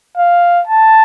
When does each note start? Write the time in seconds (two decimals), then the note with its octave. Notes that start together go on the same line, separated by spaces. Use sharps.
0.17 F5
0.67 A5